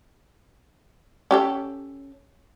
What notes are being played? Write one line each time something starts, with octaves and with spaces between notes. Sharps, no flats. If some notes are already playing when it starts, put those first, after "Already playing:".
C#4 G4 A4